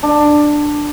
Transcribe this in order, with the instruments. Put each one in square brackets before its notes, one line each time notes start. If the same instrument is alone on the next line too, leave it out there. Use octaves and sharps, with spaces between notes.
[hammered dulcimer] D4